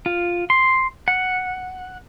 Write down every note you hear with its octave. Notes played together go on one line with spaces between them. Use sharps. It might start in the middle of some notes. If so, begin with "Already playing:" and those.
F4
C6
F#5